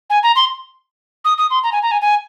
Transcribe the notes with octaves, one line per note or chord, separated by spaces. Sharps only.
G#5
A#5
C6
D#6
D#6
C6
A#5
G#5
A#5
G#5
G#5